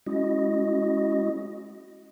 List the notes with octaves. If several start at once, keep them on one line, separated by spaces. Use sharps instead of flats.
G#3 C#4 E4 F#4 D#5